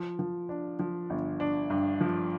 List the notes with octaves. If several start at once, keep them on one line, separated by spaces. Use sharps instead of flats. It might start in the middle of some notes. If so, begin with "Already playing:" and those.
Already playing: F3
F3
D4
F3
G1
D4
G2
F3